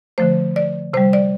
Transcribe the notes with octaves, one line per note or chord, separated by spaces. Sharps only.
D3 F3 A3 C5
D5
C3 G3 C5
D5